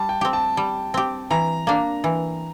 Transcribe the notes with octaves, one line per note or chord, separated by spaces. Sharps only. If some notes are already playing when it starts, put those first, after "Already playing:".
Already playing: G3 A5
G5
C4 G4
A5
G3
C4 G4
E3 A#5
A#3 D4
E3